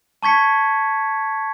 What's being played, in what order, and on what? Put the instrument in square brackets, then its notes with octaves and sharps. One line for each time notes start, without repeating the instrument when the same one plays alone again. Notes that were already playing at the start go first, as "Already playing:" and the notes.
[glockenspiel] A5 C#6 G#6 B6 C#7